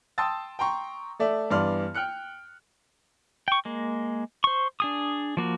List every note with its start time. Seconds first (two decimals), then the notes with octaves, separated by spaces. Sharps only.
0.18 G5 A5 C6 D#6 E6 A6
0.59 G5 A#5 C6 C#6
1.19 A3 A4 D5 E5
1.51 G2 E3 B3 D5 C6 F6
1.95 G5 F6 F#6 C#7
3.48 G5 C#6
3.65 G#3 A#3
4.44 C5 C#6
4.80 D4 G#4 D#6
5.37 F3 A#3 F#4